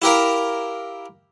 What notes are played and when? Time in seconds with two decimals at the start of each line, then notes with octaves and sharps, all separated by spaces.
0.02 E4 G4 A#4 F5